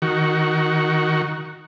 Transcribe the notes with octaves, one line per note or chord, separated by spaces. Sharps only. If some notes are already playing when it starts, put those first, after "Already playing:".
D#3 F#4